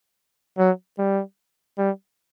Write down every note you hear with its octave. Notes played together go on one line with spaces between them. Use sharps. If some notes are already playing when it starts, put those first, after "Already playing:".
F#3
G3
G3